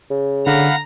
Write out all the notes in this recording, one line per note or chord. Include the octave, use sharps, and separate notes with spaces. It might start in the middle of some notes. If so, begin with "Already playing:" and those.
C#3
D3 F5 F#5 A#5 B5